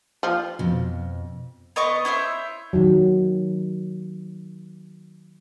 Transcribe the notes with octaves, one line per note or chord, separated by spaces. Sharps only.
F3
F2 B2
B3 D#5 C#6 D6
E4 C5 C#5 E5
D#3 F#3